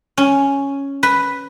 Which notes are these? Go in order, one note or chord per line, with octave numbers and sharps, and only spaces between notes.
C#4
B4